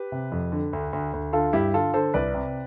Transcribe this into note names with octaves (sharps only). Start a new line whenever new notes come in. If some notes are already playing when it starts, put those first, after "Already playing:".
Already playing: G4 B4
C3
F2
D3
D2
D2
D2
D3 F4 A4
G2 E4 G4
D3 F4 A4
D3 A4 C5
C2 B4 D5
C3